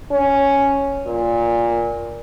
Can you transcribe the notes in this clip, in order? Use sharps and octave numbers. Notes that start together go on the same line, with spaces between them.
C#4
A#2